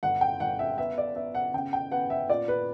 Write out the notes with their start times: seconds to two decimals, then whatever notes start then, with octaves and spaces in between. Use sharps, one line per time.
0.03 G1 F#5
0.21 G5
0.40 G1 F#5
0.59 E5
0.78 B3 E5
0.98 D5
1.16 B3 E5
1.35 F#5
1.54 C#3 G5
1.73 G5
1.92 B3 F#5
2.10 E5
2.29 A#2 D5
2.48 B4